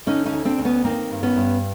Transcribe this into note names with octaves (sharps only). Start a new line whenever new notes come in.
D3 C#4 D#4
C#4 D#4
D2
C4 D4
D2
B3 C#4
D#3 A#3 C4
G2
B3 C#4
G2